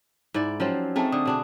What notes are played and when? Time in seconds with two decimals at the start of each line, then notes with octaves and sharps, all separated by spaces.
0.34 G#2 E4 D5
0.60 F3 F#3 C4 C#4
0.96 A3 C4 D#4 G#4 A5
1.12 D3 D#6
1.25 B2 D4 G#4